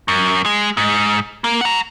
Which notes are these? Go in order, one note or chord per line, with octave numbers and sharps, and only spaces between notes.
F#2
G#3
G#2
A#3
F#5 A#5